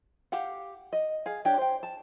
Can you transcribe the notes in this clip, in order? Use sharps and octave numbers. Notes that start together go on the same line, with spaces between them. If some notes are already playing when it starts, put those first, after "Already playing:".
G4 F5 F#5
D#5
G#4 F5
D4 G4 C#5 G5
C5 G5
A5